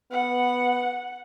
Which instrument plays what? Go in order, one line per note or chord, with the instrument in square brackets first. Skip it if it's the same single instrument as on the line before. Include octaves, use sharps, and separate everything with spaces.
[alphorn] B3 [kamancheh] F#5